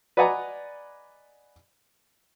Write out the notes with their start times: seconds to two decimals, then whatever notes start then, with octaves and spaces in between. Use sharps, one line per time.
0.17 B4 D5 D#5 F#5 G#5 A#5